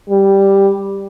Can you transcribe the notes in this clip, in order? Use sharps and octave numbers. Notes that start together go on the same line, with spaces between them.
G3